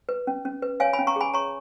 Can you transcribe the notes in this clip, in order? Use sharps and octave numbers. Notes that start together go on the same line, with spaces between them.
B4
C#4
C#4
B4
C#5 F5 G#5
G#5 B5
C#4
A#5 C#6
G#4 G#5 B5
C#5 A#5 C#6